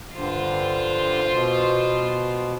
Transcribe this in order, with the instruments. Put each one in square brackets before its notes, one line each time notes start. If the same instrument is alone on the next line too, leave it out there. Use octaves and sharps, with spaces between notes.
[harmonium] G2 D3 [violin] F4 C5
[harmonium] B2